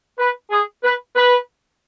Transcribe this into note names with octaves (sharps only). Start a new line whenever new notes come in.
B4
G#4
B4
B4